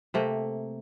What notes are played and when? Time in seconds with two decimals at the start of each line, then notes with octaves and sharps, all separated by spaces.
0.14 C3 A3 A#3